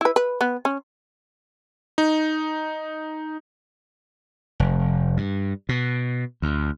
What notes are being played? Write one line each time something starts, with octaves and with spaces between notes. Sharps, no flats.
E4 B4
B4
B3
C#4
D#4
F1
G2
B2
D2